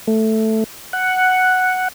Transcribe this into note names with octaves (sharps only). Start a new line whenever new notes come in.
A3
F#5